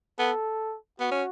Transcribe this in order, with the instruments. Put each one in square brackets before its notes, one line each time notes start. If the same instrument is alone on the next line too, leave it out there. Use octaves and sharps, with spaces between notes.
[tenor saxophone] B3 [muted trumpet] A4
[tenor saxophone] B3 [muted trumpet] F#4
[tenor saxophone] C#4